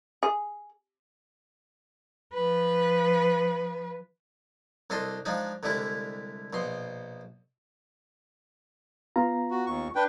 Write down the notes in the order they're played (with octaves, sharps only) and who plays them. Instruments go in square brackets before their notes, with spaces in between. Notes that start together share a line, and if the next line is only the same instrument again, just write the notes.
[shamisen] G#4
[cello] F3 B4
[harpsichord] C2 D4 A4 D#5 C6
F3 G#3 D4 D#4
C2 D3 G3 G#3 E4
A#1 B2 C6
[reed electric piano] B3 F4 A#5
[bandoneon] F#4
D#2 C#6
D4 B4 G5